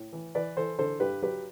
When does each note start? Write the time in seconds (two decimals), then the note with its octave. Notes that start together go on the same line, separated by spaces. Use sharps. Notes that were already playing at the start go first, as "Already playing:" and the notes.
Already playing: A2
0.13 E3
0.35 E3 B4 D5
0.57 E3 A4 C5
0.79 D3 A4 C5
1.00 G2 G4 B4
1.22 F#3 G4 B4